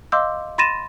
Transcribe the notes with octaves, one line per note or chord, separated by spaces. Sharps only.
D#5 F5 C6 D6 E6 G6
B5 C6 A6 A#6 D#7 E7